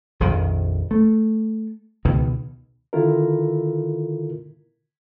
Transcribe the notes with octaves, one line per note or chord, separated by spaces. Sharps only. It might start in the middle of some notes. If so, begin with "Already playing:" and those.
A#1 F2 D#3
A3
C#2 B2 D#3
D3 D#3 E4 F4 A4 A#4